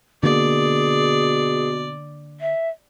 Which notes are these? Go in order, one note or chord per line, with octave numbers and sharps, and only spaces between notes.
B2 D3 A#3 G#4 D5
E5